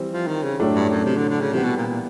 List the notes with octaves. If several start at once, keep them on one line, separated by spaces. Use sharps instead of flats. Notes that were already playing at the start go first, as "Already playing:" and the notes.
Already playing: E3 G3 C4
F3
D#3
C#3
A2 F#3 A3 D4 G4
G2
F#2
C3
D3
D3
C#3
C3 E3 G3 B3
B2
A#2
A#2